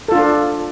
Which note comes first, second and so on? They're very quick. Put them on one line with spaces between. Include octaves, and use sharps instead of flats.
A4 F4 D4